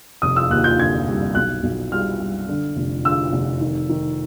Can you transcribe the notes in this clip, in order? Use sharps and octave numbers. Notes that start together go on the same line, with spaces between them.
F1 D#6
E6
D#2 F#6
G6
D3 G#6
G3
B1 F#6
B1
G3 F6
G3
D3
F1
D3 E6
F1
D#3
D#3